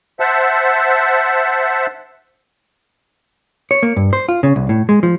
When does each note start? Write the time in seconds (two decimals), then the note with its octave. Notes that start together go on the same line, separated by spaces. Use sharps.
0.20 C5 E5 F#5 A5
3.71 C#5
3.83 A#3
3.97 G2
4.13 C5
4.29 F4
4.43 C#3
4.56 C2
4.69 A2
4.89 G#3
5.03 F3